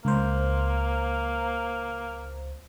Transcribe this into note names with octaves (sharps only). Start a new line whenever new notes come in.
C#2 A#3 C5